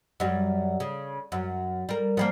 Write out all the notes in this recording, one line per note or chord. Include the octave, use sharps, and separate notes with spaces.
F#2 G3
C#3
F#2
G3 A#4
F3 G3 A#3